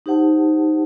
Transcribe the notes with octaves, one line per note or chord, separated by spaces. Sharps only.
D#4 G4 C5 F#5 A5